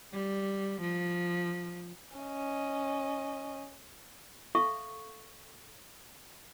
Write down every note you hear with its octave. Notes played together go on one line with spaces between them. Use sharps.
G3
F3
C#4 D#5
A4 E5 F5 C#6